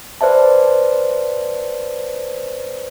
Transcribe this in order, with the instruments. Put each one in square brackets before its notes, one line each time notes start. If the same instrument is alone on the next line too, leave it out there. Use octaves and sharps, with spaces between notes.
[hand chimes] B4 C5 D5 E5 A5